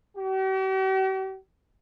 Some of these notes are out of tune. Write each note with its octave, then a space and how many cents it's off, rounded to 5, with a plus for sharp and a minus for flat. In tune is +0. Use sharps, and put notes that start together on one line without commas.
G4 -45